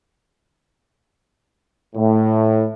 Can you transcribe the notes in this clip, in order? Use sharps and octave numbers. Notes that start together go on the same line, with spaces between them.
A2